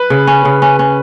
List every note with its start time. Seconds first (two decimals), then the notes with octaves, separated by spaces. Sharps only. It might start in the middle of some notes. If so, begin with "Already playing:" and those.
Already playing: B4
0.10 C#3
0.27 C#4
0.45 C#3
0.62 C#4
0.79 C#4